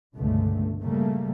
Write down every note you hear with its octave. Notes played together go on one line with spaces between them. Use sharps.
G1 C#2 G2 B2 D3 A3
A#2 C#3 G3 A3 A#3